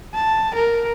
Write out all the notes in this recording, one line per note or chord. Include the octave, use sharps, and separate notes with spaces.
A5
A#4